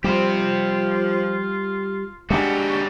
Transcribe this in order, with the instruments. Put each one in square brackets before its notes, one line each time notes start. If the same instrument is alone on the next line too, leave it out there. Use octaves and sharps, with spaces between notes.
[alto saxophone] F3 [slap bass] G3 [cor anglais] F4 [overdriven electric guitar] G4 C5
[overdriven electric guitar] G3 F#4 [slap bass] G#3 D4 [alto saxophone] G4